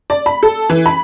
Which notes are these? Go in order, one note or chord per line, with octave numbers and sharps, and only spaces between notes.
D5
B5
A4
E3
B5